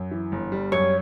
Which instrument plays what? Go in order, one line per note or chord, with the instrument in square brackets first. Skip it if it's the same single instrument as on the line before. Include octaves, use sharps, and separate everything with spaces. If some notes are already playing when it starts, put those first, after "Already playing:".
Already playing: [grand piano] F#2
E3
G1
G3
[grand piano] F#2 [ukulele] C#5